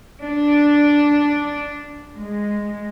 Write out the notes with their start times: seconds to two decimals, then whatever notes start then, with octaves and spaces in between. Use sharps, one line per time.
0.23 D4
2.16 G#3